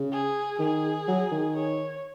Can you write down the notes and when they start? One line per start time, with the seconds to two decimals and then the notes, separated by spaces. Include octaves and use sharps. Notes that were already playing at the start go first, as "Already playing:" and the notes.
Already playing: C#3
0.12 G#4
0.59 D#3 G#4
1.08 F#3
1.31 D#3
1.55 C#5